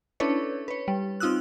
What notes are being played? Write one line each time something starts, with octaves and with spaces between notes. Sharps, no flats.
C#4 D4 E4 A4 B4 C#5
B4 C#5
G3
C4 D#4 F4 D#6 E6 F#6